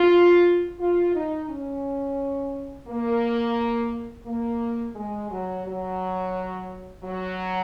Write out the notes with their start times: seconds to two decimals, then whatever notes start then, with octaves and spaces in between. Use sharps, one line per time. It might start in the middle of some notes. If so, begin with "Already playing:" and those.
Already playing: F4
0.80 F4
1.14 D#4
1.49 C#4
2.88 A#3
4.27 A#3
4.96 G#3
5.31 F#3
5.66 F#3
7.04 F#3